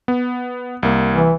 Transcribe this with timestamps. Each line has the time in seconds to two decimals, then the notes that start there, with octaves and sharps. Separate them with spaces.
0.08 B3
0.83 C2 A#3
1.13 E3